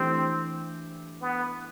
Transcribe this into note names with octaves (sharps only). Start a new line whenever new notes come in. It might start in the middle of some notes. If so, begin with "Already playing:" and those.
Already playing: E3 A3 C4 D4 G4
B3